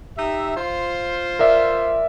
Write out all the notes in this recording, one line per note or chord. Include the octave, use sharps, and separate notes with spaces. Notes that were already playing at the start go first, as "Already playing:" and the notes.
D#4 G4 E5
F4 C5
A#4 D5 E5